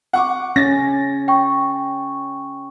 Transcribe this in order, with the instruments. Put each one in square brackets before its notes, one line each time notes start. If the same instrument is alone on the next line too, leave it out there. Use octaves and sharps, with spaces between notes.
[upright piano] F#5 C#6 D6
[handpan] C#4 [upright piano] A6 A#6
[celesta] G5 C#6